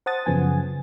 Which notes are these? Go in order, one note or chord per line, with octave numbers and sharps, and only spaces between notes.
C5 F#5 A5 D#6 A6
F#2 C#3 F3 B3 G#5